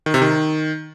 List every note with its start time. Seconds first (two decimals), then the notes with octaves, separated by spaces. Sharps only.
0.06 D#3
0.14 C3
0.22 D#3